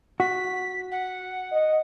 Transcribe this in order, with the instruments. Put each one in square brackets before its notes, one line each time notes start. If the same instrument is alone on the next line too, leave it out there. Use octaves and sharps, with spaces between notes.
[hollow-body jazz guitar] F#4 [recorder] B6
[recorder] F#5
[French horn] D#5